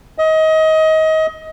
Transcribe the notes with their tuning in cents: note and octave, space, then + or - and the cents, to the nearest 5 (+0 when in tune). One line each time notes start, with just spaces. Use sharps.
D#5 +25